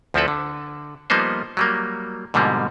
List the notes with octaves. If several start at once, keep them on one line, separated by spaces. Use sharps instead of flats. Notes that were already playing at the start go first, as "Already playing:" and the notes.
D2 F3 C4 E4 A4 B4
D3
F3 G3 A#3 B3 D#4 C5
F#3 G3 A#3
G#2 B2 D3 F3 G3 A#3